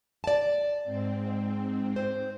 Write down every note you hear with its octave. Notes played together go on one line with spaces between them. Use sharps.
D5 A5
G#2 C4
C5